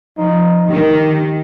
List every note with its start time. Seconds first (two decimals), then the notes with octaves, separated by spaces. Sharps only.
0.18 F3 D#4
0.70 D#3 G4